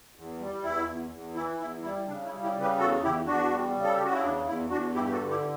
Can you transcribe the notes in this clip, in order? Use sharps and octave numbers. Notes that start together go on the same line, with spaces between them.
E2
G3
E2 E4
E2
E2
E3 E4
E2 E4
G3 E4
C#3 D4
E4
G3
E4 G4
C#3
G4 B4
E2 F#4 A4
E2 E4 G4
E2 D4 F#4
G3
C#3
A4
G4
C#3 F#4
E4
E2 D4
E2 E4
E2 D4 F#4
G2 E4 G4
G4
F#4 A4
D3
E4 G4